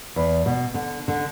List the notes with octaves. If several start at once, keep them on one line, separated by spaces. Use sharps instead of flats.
E2
B2
D3
D3